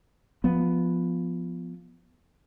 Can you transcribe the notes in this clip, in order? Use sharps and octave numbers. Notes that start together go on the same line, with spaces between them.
F3 B3